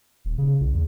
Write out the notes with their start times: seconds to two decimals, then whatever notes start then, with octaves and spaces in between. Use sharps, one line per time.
0.25 D#1
0.38 C#3
0.60 C2
0.73 E2